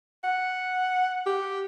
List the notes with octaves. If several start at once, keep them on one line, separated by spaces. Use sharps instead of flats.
F#5
G4